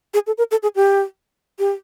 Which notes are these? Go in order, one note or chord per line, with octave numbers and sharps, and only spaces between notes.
G#4
A4
A#4
A4
G#4
G4
G4